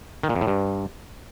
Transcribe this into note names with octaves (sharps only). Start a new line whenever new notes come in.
D#3
A#2
F2
A2
G2